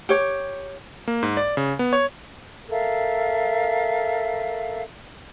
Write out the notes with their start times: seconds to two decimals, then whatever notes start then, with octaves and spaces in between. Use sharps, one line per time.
0.09 G4 C#5
1.08 A#3
1.23 G#2
1.37 D5
1.57 C#3
1.79 B3
1.93 C#5
2.70 A4 A#4 E5 F5